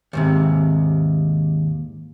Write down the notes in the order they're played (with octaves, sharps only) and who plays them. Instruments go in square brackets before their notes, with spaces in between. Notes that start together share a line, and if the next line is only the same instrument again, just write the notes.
[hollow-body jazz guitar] D#2 G#2 C3